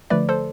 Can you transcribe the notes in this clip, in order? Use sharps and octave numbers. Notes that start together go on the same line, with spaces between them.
D3 F3 A3 B4 D5
A4 C5